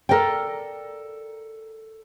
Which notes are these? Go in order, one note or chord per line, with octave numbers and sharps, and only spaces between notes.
A4 A#4 D5 F5 G5